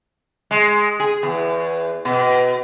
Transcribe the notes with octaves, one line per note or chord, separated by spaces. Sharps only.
G#3
G#4
E2
B2